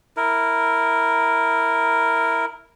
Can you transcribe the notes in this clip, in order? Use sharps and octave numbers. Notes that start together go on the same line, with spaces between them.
E4 A#4